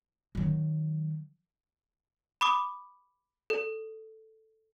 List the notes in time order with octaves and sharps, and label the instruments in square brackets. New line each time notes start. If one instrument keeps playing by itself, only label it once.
[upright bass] D#3 F#3
[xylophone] B5 D6 D#6
A4